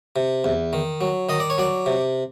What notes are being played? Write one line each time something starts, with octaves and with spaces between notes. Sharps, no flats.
C3
E2
D#3
F#3
D#3 D#5
D5
C#5
F#3 D5
C3